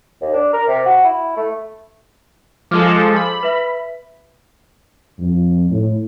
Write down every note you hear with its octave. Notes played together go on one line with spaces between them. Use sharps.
D#2
D4
A#4
C3
F#4
E4
A3
F3 G#3 A4 D6 F6
B5
B4 E5
F2
A2